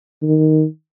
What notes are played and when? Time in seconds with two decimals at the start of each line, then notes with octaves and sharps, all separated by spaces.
0.23 D#3